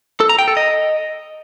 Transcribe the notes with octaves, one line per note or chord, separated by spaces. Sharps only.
A4
A#5
G5
A4
D#5